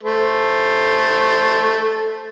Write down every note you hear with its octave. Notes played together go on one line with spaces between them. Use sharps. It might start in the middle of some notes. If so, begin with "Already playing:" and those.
A3 C5